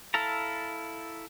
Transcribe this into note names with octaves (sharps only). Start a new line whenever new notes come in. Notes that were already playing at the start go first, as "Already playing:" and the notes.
E4 A4 F5 A5 A#5